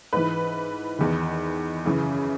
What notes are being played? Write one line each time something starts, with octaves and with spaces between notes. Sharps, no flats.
G#2 E3 B4
E2 D#3
F#2 C#3 E3